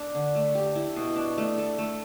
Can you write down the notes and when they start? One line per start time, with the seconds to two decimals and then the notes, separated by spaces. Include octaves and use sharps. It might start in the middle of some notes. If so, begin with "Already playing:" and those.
Already playing: D4 A4
0.14 D3
0.35 A3
0.55 G4
0.75 E4
0.96 B2
1.16 D4
1.38 A3
1.58 A4
1.78 A3